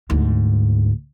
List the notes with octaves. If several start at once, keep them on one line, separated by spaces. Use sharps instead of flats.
D2 G#2